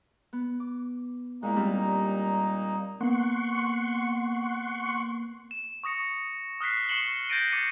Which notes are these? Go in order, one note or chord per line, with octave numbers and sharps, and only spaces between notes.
B3
D6
A#2 G#3 A#3 D#4 E4
G3 C4 E5
A#3 B3 F#5 C6 C#6
E7
C#6 D#6 A#6 C#7
D#6 F6 F#6 B6 C7
C#6 C7 C#7 E7 F#7 G7
G6 A6 A#6 D7 D#7
D6 A6 A#6 C#7 D#7